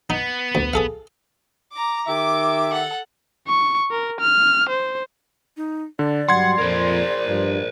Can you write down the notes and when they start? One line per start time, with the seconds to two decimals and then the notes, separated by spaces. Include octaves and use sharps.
0.10 B3 D#4
0.55 D2
0.73 G#4 A4 F5
1.72 A#5 D6
2.07 D#3 G4 E5 D6
2.71 A4 F#5
3.47 C#6
3.91 A#4
4.20 F6
4.69 C5
5.57 D#4
5.99 D3 D5
6.29 G2 F#3 G3 F#5 C6 G#6
6.58 F2 A#2 A#4 C5
7.28 G2 F3